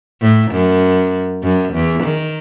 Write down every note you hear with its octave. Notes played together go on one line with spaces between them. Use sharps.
A2
F#2
F#2
E2
D#3